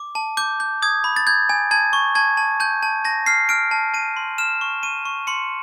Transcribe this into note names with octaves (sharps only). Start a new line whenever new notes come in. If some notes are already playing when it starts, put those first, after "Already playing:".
Already playing: D6
A5
D6 G6
G6
D#6 G#6
B5
A6
G6 G#6
G#5
A5 G#6
C#6
A5 G#6
A5
A5 G6
A5
A5 A#6
F6 C7
F6 D7
A5
A5 D#7
C6
F6 E7
C#6
C#6 D#7
C#6
C6 C#7